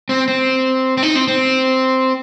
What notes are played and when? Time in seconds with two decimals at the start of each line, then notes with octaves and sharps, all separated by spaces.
0.09 C4
0.28 C4
0.97 C4
1.03 D#4
1.15 C4
1.28 C4